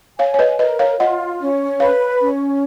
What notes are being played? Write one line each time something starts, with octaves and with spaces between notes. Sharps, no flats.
C#5 F5 G#5
C#5
B4 D#5
A#4 B4 D#5
C#5 F5
F4 D#5 F#5
C#4
B4 C#5 F5
C#4